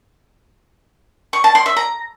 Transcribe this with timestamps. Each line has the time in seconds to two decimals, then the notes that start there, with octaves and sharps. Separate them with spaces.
1.33 C#6
1.44 A5
1.55 C6
1.66 E5
1.77 A#5